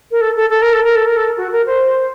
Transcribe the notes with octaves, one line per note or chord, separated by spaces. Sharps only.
A#4
A4
A4
A4
A#4
A4
A#4
A4
A#4
A4
F#4
A#4
C5